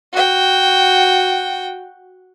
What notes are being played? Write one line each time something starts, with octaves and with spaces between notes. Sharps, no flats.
F#4 G5